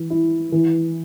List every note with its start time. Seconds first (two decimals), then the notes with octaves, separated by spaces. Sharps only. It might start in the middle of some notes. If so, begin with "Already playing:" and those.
Already playing: E3
0.10 E4
0.52 E3